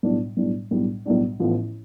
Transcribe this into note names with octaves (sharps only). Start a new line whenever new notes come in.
B1 A2 G3 D4
B1 A2 G3 D4
B1 A2 G3 D4
B1 A2 G3 D4
A1 A2 F3 B3